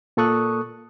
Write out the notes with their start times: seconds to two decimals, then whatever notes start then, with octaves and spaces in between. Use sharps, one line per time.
0.17 A#2 A#3 A4 C#6 D#6 F#6